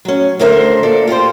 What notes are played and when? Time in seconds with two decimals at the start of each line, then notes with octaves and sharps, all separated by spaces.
0.05 F#3 C#4
0.39 D2 D3 A#4 C5 D#5 E5
0.83 A#2 A4 D5
1.07 F4 G4 A#4 C5